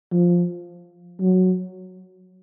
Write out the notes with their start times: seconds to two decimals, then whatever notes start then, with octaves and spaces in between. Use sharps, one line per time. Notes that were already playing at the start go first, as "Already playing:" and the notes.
0.12 F3
1.20 F#3